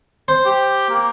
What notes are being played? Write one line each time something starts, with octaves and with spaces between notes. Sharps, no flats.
C5
G4
A#3